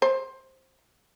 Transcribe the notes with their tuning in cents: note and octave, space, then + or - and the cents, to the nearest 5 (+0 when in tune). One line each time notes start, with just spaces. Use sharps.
C5 +15